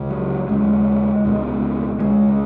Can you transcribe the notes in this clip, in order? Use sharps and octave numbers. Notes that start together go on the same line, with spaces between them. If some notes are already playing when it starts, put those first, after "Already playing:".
Already playing: C#2 C#3
F#3
D#2 C#3 G#3
C#2 B2
C#2 C#3 G#3